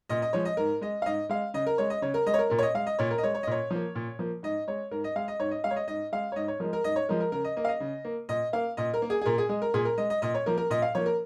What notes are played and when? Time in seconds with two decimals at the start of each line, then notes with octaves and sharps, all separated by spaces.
0.09 A#2 D#5
0.22 D#5
0.33 F3 G#3 C#5
0.45 D#5
0.57 G#2 A#4
0.81 G#3 D#5
1.02 F5
1.06 G#2 D#5
1.29 G#3 F5
1.54 C#3 D#5
1.66 A#4
1.78 G#3 C#5
1.90 D#5
2.02 C#3 C#5
2.14 A#4
2.26 G#3 D#5
2.34 C#5
2.39 A#4
2.50 A#2 A#4
2.59 C#5
2.63 D#5
2.74 G#3 F5
2.87 D#5
2.99 A#2 C#5
3.11 A#4
3.18 D#5
3.23 G#3 C#5
3.35 C#5
3.43 D#5
3.47 A#2 C#5
3.70 F3 A#3
3.95 A#2
4.19 F3 A#3
4.43 G#2 D#5
4.67 G#3 C#5
4.91 G#2 A#4
5.04 D#5
5.16 G#3 F5
5.28 D#5
5.39 G#2 C#5
5.51 D#5
5.64 G#3 F5
5.71 C#5
5.76 D#5
5.88 G#2 D#5
6.12 G#3 F5
6.32 C#5
6.36 G#2 D#5
6.48 C#5
6.60 F3 G#3 A#4
6.73 A#4
6.84 G#2 D#5
6.96 C#5
7.09 F3 G#3 A#4
7.20 A#4
7.32 C#3 A#4
7.45 D#5
7.57 A#3 D#5
7.65 F5
7.69 D#5
7.80 C#3
8.05 A#3
8.29 A#2 D#5
8.53 A#3 F5
8.77 A#2 D#5
8.94 A#4
9.02 A#3
9.10 G#4
9.21 G#4
9.25 A#2 A#4
9.38 G#4
9.49 G#3 G#4
9.62 A#4
9.74 A#2 G#4
9.85 A#4
9.98 G#3 D#5
10.10 D#5
10.22 A#2 D#5
10.34 C#5
10.46 F3 A#3 A#4
10.58 A#4
10.70 A#2 D#5
10.82 F5
10.95 F3 A#3 C#5
11.06 A#4